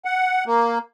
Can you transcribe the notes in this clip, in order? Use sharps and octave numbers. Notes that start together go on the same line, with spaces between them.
F#5
A#3